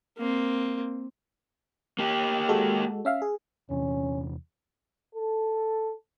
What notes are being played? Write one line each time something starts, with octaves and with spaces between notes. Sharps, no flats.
A#3 C4
A#3 G4
G#3 F#4 A4
C#4 E5 F5
G#4
E2 C3 E3 C#4
A4